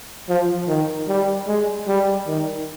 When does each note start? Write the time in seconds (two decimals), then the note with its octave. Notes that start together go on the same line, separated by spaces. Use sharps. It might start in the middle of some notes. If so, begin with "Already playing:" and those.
0.29 F3
0.68 D#3
1.08 G3
1.48 G#3
1.88 G3
2.27 D#3